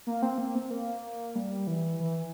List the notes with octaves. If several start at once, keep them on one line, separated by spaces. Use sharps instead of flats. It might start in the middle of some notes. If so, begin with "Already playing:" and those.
A#3
C4
A#3
C4
A#3
G3
E3
E3